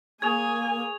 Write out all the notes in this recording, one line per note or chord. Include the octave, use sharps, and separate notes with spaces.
A#3 G#4 C#5 G#5 G#6 F7